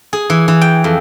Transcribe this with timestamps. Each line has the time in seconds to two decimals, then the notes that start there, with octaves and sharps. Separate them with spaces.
0.13 G#4
0.30 E3
0.48 E3
0.61 G5
0.84 F2